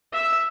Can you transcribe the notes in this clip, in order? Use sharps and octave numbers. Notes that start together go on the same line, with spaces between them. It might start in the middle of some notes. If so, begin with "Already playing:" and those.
E5